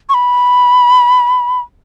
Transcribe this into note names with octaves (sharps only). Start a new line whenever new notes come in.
C#6
B5